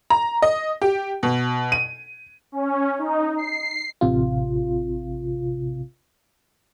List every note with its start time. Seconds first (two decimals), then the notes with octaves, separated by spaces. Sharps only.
0.10 A#5
0.42 D#5
0.82 G4
1.23 B2
1.72 D#7
2.52 C#4
2.99 D#4
3.37 C7
4.01 A1 C3 F4